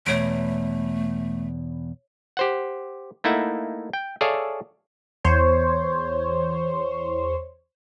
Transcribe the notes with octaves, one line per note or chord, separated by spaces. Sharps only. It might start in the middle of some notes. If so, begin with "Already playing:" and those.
E2 B2 A3 C#5 D7
G4 C5 F#5
A3 A#3 D#4 E4 E5 F#5
G5
G#4 A4 C#5 D5 E5 F5
E2 C5 C#5